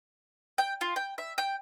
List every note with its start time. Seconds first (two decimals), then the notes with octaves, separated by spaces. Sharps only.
0.58 G5
0.81 F4
0.96 G5
1.18 E5
1.38 G5